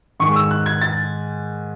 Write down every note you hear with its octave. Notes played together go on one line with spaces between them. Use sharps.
G#2 D#3 G#3 C#6
E6
F#6
G#6
A6